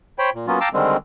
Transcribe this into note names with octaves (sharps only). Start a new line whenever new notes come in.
C5 C#5 G5 B5
A#2
F#3 A#3 B3 C#4 F4
F5 G5 A5 A#5 D6 E6
D3 D#3 G3 G#3 C4